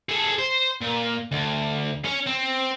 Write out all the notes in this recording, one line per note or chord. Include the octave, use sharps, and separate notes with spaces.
G#4 A4
C5
A#2
D2
C#4 C#5
C4